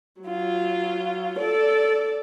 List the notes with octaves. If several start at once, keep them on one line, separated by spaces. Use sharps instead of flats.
F#3 F4
A4 D5